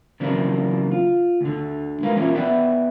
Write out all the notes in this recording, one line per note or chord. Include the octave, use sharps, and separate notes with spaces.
C#3 E3 F#3 A#3 C4 D4
F4
D2 D3
G#3 F#4 A#4 B4 F5
E3 F3 A#3 C4 C#4 E4
B3 B4 D5 E5 G5